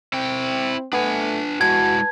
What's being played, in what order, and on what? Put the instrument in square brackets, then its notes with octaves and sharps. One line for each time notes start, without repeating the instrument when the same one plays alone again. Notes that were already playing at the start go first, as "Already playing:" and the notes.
[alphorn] C4 [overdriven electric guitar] E4 G5
[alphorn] A3 [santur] B3 [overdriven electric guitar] D4 G#5
[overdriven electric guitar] G#3 E4 [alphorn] F#4 [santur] A5 [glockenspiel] G#6